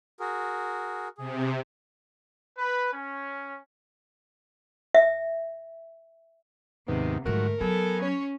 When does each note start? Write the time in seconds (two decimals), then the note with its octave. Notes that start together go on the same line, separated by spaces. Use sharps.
0.20 F#4 G#4 A#4
1.18 C3 G#4
2.57 B4
2.92 C#4
4.95 E5
6.88 D#2 G#2 C3 D#3 B3
7.26 G#2 D3 F3 F#3 A3 F#4 A#4
7.61 F#3 B3 A4 G#5
8.02 C#4 C#5